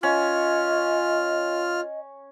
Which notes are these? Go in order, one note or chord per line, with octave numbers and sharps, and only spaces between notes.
C#4 F4 D#5 F6